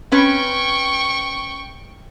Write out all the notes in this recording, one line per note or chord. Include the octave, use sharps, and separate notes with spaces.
C4 C#4 B4 G5 C#6